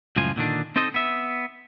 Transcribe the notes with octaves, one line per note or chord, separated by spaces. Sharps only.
C#2 F#2 A2 F3 F4 G#5
A#2 D3 D#3 D4
C4 D#4 A4 C5 D#5
B3 E5